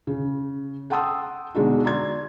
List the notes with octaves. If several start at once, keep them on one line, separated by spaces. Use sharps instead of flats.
C#3
F#5 G5 A5 C6 D#6 E6
B2 D3 G#3 D4 D#4 F#4
F#4 D5 A#5 C6 G#6